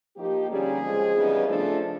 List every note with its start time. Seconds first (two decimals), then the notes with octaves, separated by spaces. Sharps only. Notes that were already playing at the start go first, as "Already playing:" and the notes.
0.16 F3 A#3 D#4 G4
0.49 D3 G3 A#3 C#4 G#4
0.82 C#3 F3 G#3 C4
1.14 C#3 E3 G3 B3 D#4
1.47 C#3 F3 A3 D4 A4